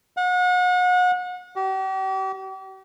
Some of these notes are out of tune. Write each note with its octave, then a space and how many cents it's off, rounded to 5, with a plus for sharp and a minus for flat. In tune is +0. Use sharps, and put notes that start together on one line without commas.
F#5 -35
G4 -40